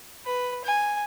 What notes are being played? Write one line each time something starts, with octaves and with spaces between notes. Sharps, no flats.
B4
G#5